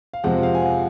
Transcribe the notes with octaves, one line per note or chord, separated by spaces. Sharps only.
F5
F2 C3 F3 G#3 F#5
F5
G#5
F#5